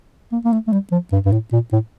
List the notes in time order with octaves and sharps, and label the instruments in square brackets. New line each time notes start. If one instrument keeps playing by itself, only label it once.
[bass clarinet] A#3
A#3
A3
A3
G3
F3
G2
G2
A2
A#2
A2